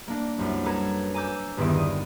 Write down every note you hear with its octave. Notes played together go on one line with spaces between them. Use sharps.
A#3 D4
C2 F#2
A4 B4 A#5 G#6
G#5 A#5 D6 E6 G6
G1 E2 G2 D#3 D7
D#6